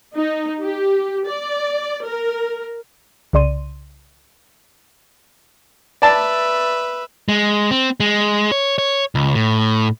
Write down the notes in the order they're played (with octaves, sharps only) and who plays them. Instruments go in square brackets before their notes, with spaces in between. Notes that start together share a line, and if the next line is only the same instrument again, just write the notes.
[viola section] D#4
G4
D5
A#4
[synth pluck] C2 C#3 D5 C6 D#7
[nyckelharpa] B4 E5 [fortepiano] D5 A5
[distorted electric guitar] G#3
C4
G#3
C#5
C#5
C#2
A2